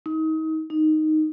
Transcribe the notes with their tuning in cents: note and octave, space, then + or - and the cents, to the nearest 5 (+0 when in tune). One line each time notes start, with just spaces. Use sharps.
D#4 +30
D#4 +0